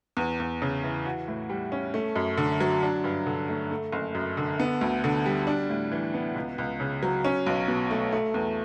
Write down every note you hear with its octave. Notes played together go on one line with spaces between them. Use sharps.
E2
E2
C#3
E3
F#4
A2
G3
C#4
A3
F#2
D3
F#3
D4
G2
D3
A3
A3
F#1
F#2
D3
B3
D2
D3
G3
D4
A2
E3
B3
C#2
C#2
C#3
F#3
C#4
B1
B2
A3
A3
E2